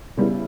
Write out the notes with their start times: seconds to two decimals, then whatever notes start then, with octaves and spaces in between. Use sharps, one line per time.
0.17 C#3 G3 B3 E4